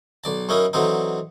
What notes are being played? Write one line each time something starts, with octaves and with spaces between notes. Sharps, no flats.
B1 D5 A5
F#2 C#4 D#4 E4 A#4
D3 E3 F#3 C4 D#4